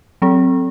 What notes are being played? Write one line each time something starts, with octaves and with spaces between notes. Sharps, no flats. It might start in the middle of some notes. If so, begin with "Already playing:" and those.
F#3 C4 A4